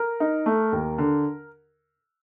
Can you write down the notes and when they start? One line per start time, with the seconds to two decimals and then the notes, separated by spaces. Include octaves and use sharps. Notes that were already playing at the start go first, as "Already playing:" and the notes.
Already playing: A#4
0.20 D#4
0.46 A3
0.73 D#2
0.98 D3